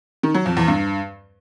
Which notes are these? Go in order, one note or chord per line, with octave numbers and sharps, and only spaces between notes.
D#3
F#3
F2
E2
G2